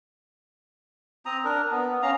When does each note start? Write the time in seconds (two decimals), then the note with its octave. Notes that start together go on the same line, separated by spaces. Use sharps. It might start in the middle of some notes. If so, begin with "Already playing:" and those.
1.26 C4 A#5 D#6
1.44 D4 A#4
1.71 B3
2.03 C#4 F5 A#5